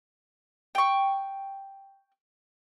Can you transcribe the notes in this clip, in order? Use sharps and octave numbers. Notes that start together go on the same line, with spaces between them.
G5 C#6